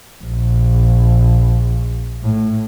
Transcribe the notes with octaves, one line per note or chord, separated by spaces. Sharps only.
A#1
A2